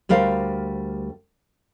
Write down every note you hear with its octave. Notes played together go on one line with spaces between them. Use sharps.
D2 G3 A#4 C5 F5